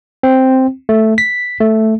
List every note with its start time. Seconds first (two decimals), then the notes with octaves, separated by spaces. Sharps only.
0.23 C4
0.89 A3
1.18 B6
1.60 A3